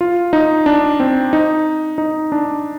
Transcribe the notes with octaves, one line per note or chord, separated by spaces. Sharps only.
F4
D#4
D4
C4
D#4
D#4
D4